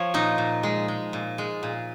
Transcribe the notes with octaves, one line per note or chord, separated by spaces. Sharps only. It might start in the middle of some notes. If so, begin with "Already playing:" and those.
Already playing: F3 C#5
A#2 D#4
A#2
G#3
G#3
A#2
G#3
A#2